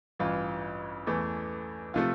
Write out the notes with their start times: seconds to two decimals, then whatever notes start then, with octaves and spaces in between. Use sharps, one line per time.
0.19 A1 G2 E3 F4
1.07 E2 E3 A3
1.94 C3 F3 A3 F4